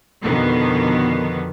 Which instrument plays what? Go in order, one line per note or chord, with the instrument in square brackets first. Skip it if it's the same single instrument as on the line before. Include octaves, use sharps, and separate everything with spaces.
[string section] F2 B2 D3 D#3 B3